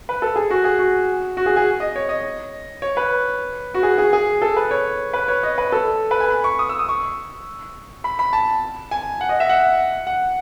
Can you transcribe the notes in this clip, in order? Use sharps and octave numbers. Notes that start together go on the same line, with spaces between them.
B4
A4
G#4
F#4
G#4
F#4
F#4
G#4
G#4
D#5
C#5
D#5
C#5
B4
F#4
G#4
G#4
G#4
A4
B4
C#5
B4
C#5
D#5
B4
A4
B4
G#5
B5
C#6
D#6
E6
D#6
C#6
B5
B5
A5
G#5
F#5
D#5
E5
F#5
F#5